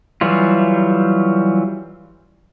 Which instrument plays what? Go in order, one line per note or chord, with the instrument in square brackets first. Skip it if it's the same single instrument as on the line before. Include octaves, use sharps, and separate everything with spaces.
[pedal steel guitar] E3 F#3 G3 F4